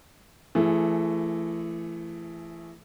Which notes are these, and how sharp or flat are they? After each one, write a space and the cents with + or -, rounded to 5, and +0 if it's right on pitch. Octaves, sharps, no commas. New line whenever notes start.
E3 +30 A3 +0 G#4 +0